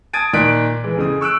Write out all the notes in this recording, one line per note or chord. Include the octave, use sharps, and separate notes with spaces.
A5 D#6 G#6 A6 D7 D#7
A#2 D#3 D5 F#6 B6 D7
E3 G#3
F2 C#3 D#6
C#6 E6 F#6 D7